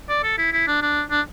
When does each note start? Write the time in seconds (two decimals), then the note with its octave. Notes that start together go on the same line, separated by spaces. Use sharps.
0.09 D5
0.24 A4
0.38 E4
0.53 E4
0.67 D4
0.82 D4
1.10 D4